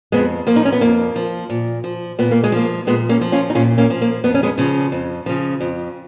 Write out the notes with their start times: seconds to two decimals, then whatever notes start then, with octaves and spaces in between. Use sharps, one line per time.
0.12 F2 G#3 B3
0.47 F3 A#3
0.56 D#4
0.65 C#4
0.72 B3
0.81 F2 A#3
1.16 F3
1.50 A#2
1.84 F3
2.19 A#2 B3
2.31 A#3
2.44 G#3
2.52 F3 A#3
2.87 A#2 G#3 B3
3.09 A#3 C#4
3.21 F3
3.32 C#4 F4
3.50 D#4
3.55 A#2 C#4 F4
3.78 A#3 C#4
3.90 F3
4.01 A#3
4.24 F2 B3
4.34 C#4
4.43 G#3 B3
4.58 C#3 F3
4.92 F2
5.26 C#3 F3
5.60 F2